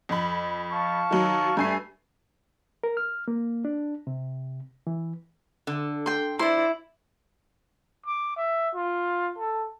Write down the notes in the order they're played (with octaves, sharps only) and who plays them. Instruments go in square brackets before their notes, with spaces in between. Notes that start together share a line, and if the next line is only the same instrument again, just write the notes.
[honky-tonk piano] F2 B5
[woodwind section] F5 A5 C#6
[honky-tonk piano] D#3 F#3
[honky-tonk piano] G2 G#5 C7 [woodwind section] A3
[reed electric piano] A#4
F6
A#3
D4
C3
E3
[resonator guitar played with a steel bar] D3
[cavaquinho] G5 C6
[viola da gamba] E4 [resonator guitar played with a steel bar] C5 D5 [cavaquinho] C6
[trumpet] D6
E5
F4
A4